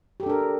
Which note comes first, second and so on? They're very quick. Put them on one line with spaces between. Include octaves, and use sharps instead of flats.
G4 A4 D4 A#4